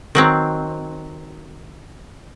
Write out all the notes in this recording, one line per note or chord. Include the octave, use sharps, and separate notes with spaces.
D#3 F#3 C4